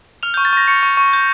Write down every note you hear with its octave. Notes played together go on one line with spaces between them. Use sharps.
F6 F7
C#6 G6
A6
C#6 A#6
C#6 C#7
C#6
C#6
G6